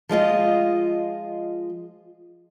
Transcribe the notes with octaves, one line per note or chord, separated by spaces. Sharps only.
F3 G#3 F4 D#5